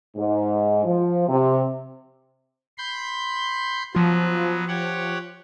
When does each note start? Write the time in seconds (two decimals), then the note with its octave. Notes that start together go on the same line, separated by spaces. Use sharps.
0.17 G#2
0.85 F3
1.28 C3
2.78 B5 C6 G6
3.95 F3 F#3 B3 F4
4.68 G4 C#5 F#5